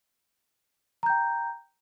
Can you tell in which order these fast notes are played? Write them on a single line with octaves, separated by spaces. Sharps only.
A#5 G6 G5